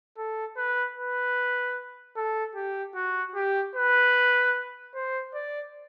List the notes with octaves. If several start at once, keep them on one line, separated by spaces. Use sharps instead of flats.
A4
B4
B4
A4
G4
F#4
G4
B4
C5
D5